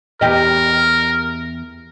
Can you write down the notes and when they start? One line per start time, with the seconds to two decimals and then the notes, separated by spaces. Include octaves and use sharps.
0.21 E2 G4 A#4 D#5